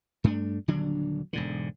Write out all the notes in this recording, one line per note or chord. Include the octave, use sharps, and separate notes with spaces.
G2 A3 D4
D#1 D3 F#3 D4
E1 G#2 D3